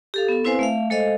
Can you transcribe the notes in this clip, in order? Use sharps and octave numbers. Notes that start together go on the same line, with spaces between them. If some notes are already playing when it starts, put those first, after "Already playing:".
G4 A4 F5
B3 A4
C4 E4 B4 C5 F5 G#5
A3 E5 F5
G#3 A4 C5 D#5 F5